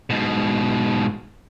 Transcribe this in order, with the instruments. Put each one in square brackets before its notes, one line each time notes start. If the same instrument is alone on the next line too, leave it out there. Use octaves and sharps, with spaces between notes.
[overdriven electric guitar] G#2 B2